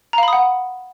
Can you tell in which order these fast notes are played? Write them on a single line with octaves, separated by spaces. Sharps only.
A#5 F5 B5 D#6 F#5